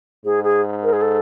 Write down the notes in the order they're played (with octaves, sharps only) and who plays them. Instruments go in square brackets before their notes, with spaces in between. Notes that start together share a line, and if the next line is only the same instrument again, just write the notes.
[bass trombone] G#2 [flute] G#4
[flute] G#4
A#4
G#4
A4